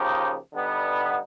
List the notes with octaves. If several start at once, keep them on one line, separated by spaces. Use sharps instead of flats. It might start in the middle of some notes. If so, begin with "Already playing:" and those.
Already playing: C#3 F3 A#3 D#4 G4
D3 G3 B3 D#4